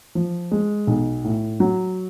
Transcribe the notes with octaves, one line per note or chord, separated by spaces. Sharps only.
F3
G#3
B1
A2
F#3